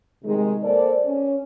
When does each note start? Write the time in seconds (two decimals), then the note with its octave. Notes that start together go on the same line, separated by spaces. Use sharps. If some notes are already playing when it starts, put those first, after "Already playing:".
0.25 C3 D#3 G#3
0.63 A#3 A4 C5 D5
1.05 C#4